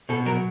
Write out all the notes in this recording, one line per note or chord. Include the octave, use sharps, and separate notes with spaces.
B2 A4
F#3 A#4